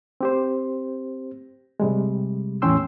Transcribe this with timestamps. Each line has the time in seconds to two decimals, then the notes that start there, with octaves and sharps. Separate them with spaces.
0.21 C4 G4 C5
1.80 C3 G3 G#3
2.62 E2 A2 C#4 G5 C6 E6